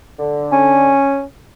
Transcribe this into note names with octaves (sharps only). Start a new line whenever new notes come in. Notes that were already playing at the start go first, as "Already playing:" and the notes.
D3
C#4